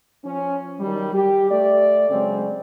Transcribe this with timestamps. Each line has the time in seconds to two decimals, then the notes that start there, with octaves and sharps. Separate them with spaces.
0.24 F3 C#4
0.80 D#3 F#3 G3
1.14 G4
1.51 A3 D5
2.10 C#3 F#3 G#3 C4 C#4